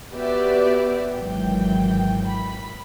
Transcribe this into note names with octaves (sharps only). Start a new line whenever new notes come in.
B3 F#4 G4 B4 D5 E5
G#1 E3 F#3 G5
B5